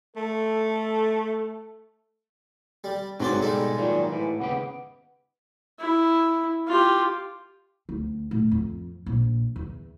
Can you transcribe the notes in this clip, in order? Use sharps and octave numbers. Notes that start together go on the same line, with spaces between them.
A3 A4
G3
C2 G#2 C3 F#3 B3 D5 C6
B2 G3 G#3 D#4 A4
A#2 D#3 E3 F#3
A2 E3
D#2 C#3 B3 G4
E4
F4 G4
D2
A2
F2
A#1
E2